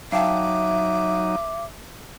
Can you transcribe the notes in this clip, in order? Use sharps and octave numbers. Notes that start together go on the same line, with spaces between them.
F#3 D#4 E5 F5 G5 A5 D6